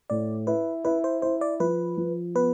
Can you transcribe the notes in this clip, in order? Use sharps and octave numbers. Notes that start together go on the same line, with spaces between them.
A2 D5
E4 B4
E4 B4
C5
E4 C5
D5
F3 B4
F3
B3 B4